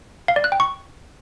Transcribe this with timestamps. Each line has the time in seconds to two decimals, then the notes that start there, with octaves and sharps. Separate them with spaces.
0.28 F5
0.36 D5
0.44 F#6
0.52 G5
0.60 C#6